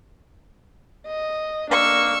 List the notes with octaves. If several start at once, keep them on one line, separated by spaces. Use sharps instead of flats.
D#5
A#3 D4 C#6 E6